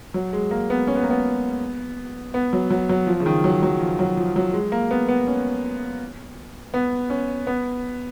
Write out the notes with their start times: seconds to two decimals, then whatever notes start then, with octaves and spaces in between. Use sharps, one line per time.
0.14 F#3
0.33 G#3
0.51 A#3
0.70 B3
0.87 C#4
0.95 B3
1.03 A#3
1.10 B3
2.34 B3
2.53 F#3
2.70 F#3
2.89 F#3
3.07 F3
3.20 C#3
3.26 D#3
3.44 F#3
3.63 F#3
3.81 F3
3.99 F#3
4.17 F3
4.36 F#3
4.53 G#3
4.72 A#3
4.91 B3
5.08 B3
5.27 C#4
6.74 B3
7.10 C#4
7.47 B3